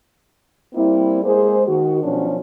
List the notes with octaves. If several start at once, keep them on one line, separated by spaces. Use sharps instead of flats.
G3 A#3 C4 E4
G#3 A#3 G#4 C5
D#3 F#4
B2 F3 F#3 C#4 D4